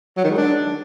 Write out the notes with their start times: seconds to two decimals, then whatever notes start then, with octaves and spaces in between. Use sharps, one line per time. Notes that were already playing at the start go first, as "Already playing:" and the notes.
0.17 F#3
0.24 D#3
0.31 G#3
0.38 D4